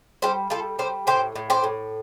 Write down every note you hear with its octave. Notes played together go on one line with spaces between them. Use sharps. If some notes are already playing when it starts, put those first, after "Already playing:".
G3 G4 C5
G3 F4 A4
G3 G4 C5
A2 G4 C5
A2
G4 C5
A2